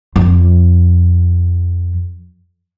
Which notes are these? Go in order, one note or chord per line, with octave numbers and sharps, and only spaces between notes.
F2